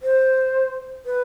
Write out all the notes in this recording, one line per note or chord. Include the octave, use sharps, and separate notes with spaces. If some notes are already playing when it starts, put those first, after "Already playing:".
C5
B4